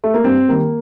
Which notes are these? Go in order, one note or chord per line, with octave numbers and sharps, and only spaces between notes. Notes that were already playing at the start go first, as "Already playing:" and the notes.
A3
A#3
G2 C4
D#3 G3 A#3